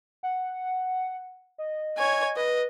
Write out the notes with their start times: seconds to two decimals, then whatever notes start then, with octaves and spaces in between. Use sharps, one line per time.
0.23 F#5
1.58 D#5
1.98 C#5 G#5
2.37 B4 D#5